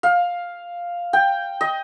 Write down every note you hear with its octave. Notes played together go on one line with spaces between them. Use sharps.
F5
G5
D#5